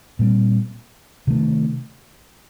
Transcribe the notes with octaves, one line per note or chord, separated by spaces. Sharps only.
A#2 G3 C4
C3 D#3 A3